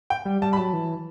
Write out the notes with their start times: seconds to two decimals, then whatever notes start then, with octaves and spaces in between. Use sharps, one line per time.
0.10 G5
0.25 G3
0.42 G3 A5
0.53 B5
0.57 F#3 A5
0.73 E3